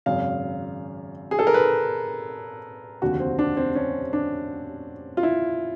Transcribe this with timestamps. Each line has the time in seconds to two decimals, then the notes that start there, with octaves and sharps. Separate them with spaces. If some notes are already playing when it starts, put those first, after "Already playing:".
0.06 G#1 F#2 C#3 F5
1.31 G#4
1.39 A4
1.47 A#4
1.54 B4
3.02 F1 D#2 D3 F#4
3.20 C4
3.39 D4
3.57 C4
3.75 C#4
4.13 D4
5.17 F4
5.23 E4